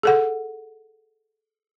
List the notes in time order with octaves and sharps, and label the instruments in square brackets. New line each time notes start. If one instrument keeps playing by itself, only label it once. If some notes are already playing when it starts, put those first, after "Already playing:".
[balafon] G#4 A4 F#5